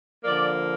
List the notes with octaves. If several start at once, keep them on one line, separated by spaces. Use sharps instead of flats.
D3 F3 A#3 D5